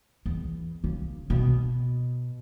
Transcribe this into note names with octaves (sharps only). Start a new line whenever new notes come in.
E2
C#3
B2